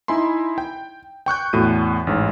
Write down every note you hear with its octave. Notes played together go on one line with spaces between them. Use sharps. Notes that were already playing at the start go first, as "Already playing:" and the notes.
D#4 E4 G#5 B5 C6
G5
G5 C#6 F#6 G6
E2 A2 F#4 D#7
A1 G#2